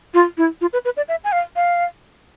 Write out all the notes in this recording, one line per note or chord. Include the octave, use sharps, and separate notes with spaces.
F4
E4
F4
B4
B4
D5
E5
G#5
F5
F5